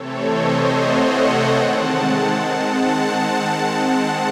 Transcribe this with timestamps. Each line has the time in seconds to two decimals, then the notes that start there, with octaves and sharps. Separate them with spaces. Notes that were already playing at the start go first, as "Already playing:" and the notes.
Already playing: C3 E3 A3 C4 A4 C#5
0.29 C5 D#5
0.71 D#5 F#5
1.54 D#3 G#3 C4 F#5 A5
2.79 F#5 A5